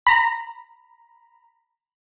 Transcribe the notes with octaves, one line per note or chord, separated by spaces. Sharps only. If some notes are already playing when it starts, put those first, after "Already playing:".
A#5 B5